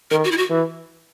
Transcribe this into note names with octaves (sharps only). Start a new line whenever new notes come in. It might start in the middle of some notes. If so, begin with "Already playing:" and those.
D#3 A#4
F#4
E4
F#4
E3